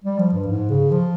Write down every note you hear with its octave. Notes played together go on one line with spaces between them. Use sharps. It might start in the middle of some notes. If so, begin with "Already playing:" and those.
G3
F3
G2
G#2
C#3
F3